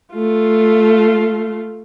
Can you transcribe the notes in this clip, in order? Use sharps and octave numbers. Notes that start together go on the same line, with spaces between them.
A3 F4